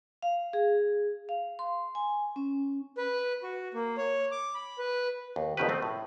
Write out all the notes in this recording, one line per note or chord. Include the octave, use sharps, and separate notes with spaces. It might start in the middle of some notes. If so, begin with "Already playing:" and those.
F5
G#4
F5
C6
G#5
C#4
B4
F#4
A#3
C#5
D6
B5
B4
D#2
A#1 F2 B2 D#3 G4 B4
A3 C4
A2